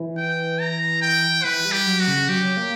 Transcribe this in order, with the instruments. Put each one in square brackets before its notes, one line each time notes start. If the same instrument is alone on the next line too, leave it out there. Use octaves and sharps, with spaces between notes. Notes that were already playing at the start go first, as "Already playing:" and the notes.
Already playing: [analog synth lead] E3
[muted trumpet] G5
A#5
G5
[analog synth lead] E3 [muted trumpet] B4
[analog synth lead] G3
[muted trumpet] G4
[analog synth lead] F#3
[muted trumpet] F#4
[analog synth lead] C#3
[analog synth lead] F#3 [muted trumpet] G4
[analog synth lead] A#3